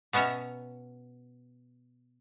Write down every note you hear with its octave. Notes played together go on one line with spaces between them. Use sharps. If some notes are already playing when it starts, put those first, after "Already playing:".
B2 B3 C#4 E5 A#5